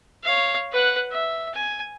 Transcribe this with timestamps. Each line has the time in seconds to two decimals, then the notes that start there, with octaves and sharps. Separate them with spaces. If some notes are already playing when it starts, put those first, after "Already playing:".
0.24 C#5 F5
0.72 B4 F#5
1.11 E5
1.54 G#5